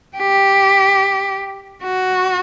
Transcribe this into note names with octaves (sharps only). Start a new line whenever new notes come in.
G4
F#4